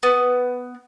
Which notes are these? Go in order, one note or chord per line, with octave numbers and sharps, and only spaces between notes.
B3